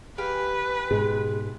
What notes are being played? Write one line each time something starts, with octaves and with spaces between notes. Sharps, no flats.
G4 B4 F5 G#5
G#2 B2 G#3